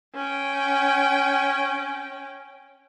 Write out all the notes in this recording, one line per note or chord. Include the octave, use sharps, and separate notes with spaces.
C#4 G5